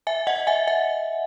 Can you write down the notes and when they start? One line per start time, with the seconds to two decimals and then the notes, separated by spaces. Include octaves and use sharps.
0.07 E5 G#5
0.27 D#5 F#5
0.47 E5 G#5
0.67 E5 G#5